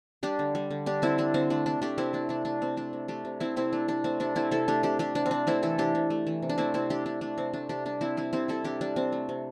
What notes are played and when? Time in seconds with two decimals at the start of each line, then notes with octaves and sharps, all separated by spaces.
0.23 G3 D4 G4
0.39 D3
0.55 G3
0.71 D3
0.86 G3 D4 G4
1.02 D3 C4 E4
1.18 G3 D4
1.34 D3 C4
1.50 A3 D4
1.66 C3 D4
1.81 A3 D4 G4
1.98 C3 C4 E4
2.13 A3 D4
2.29 C3 D4
2.45 A3 D4
2.61 C3 C4
2.77 A3 D4
2.93 C3
3.08 A3 D4 G4
3.25 C3
3.40 A3 C4 E4
3.56 C3 C4 E4
3.73 A3 D4
3.88 C3 D4
4.04 A3 C4
4.20 C3 D4
4.35 A3 C4 E4
4.51 C3 E4 A4
4.68 A3 D4 G4
4.83 C3 D4 G4
4.99 A3 D4 G4
5.15 C3 D4
5.26 C4
5.31 C3 D4
5.47 A3 C4 E4
5.63 E3 E4 A4
5.78 C3 D4 G4
5.95 C3
6.10 A3
6.27 E3
6.43 C3
6.49 D4
6.58 A3 C4 E4
6.74 C3 C4 E4
6.90 A3 D4 G4
7.06 C3 D4
7.21 A3 D4
7.38 C3 C4
7.53 A3 D4
7.69 C3 D4 G4
7.85 G3 D4
8.01 C3 C4 E4
8.17 G3 C4 E4
8.33 C3 C4 E4
8.48 G3 E4 A4
8.64 C3 D4 G4
8.81 G3 D4
8.96 C3 C4
9.12 A3
9.29 C3